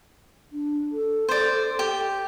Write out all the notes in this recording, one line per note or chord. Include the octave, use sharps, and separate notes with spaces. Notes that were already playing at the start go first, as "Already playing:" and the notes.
D4
A4
C5 D5
G4